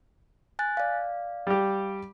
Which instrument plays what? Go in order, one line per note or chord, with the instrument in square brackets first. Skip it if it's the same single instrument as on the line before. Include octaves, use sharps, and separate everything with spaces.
[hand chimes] G#5 F#6 A6
D5 F5
[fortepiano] G3 G4